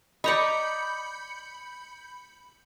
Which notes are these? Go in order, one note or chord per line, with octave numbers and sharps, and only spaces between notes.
D5 D#5 A#5 B5 C#6 G6 C#7